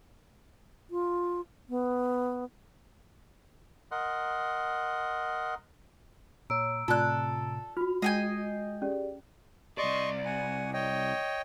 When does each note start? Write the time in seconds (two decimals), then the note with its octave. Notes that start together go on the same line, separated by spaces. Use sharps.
0.91 F4
1.69 B3
3.91 A#4 D#5 F#5 C6
6.50 A#2 C#5 A#5 E6 D7
6.88 A2 C3 F4 A4 D5 F#6
7.77 F4 F#4 F6
8.02 G#3 D#5 G5 G#5 C7
8.82 C#4 G4 G#4 D5
9.78 C2 D5 D#5 C6 C#6
10.25 F#5 G#5
10.73 C#5 D#5 G5